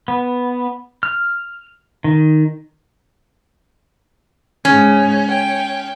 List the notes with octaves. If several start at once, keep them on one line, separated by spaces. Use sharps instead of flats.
B3
F6
D#3
G#2 C#3 C#4
G5